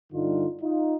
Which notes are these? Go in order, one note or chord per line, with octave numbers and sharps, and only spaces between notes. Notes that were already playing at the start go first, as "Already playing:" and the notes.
G2 D3 G3 D#4 F4
D#4 F4